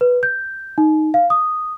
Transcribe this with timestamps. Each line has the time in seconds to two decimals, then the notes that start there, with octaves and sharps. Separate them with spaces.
0.01 B4
0.23 G6
0.78 D#4
1.14 F5
1.30 D#6